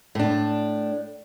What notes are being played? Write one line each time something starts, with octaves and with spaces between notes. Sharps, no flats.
A2 D4